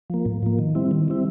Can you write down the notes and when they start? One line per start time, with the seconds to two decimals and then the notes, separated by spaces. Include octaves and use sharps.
0.10 F3 A#3
0.26 A2
0.43 F3 A#3
0.59 D#3
0.75 G3 C4 E4
0.91 D#3
1.08 G3 C4 E4